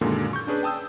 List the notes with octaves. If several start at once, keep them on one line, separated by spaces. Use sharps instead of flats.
F#2 A#2 D3 D#3 G#3 A#3
C#6 G6
C#4 D4 G#4 B4
G5 A5 D#6 E6 G6